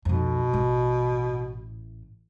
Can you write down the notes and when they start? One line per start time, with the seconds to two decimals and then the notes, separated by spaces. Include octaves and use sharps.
0.05 B1 F2 B2
0.53 A1 A2